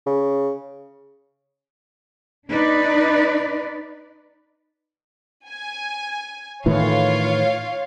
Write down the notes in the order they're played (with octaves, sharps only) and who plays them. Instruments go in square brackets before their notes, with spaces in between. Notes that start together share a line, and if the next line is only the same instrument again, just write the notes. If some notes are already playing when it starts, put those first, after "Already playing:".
[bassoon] C#3
[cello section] D4 D#4 B4 D5
[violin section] G#5
[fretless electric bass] A2 D#3 E3 [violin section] F4 C#5 F5